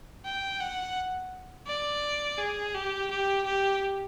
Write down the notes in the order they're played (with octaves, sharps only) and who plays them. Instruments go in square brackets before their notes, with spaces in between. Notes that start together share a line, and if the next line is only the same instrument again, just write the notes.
[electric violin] G5
F#5
D5
G#4
G4
G4
G4